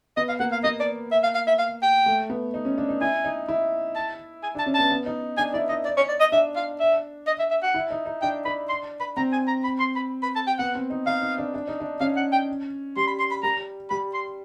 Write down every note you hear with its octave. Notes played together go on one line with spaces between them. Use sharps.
B3 D#5
F5
A#3 F#5
F5
A#3 D#5
D5
E5
F5
F5
E5
F5
G5
A3
B3
D#4
C#4
D4
D#4
E4 G#5
D#4
E4
A5
G#5
D4
A5
C#4
B3 A5
B3
D#4
D4 G#5
E4 D5
D#4 D#5
D5
C#5
D5
D#5
D4 E5
F5
E5
D#5
E5
E5
F#5
E4
D#4
D#4
D4 G5
D4 B5
C6
B5
C4 A#5
G#5
A#5
B5
C6
B5
B5
A5
G5
B3 F#5
C4
D#4
D#4 F5
D#4
D4
D4
D#4
D4
C#4 F5
F#5
G5
G3 C6
B5
C6
B5
G3 A#5
G3 B5
C6